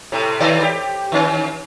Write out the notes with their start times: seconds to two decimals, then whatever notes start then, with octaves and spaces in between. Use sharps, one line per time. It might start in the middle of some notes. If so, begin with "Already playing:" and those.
0.12 A2 C3
0.40 C3 D#3 D5
0.63 G4
1.12 D#3 C#4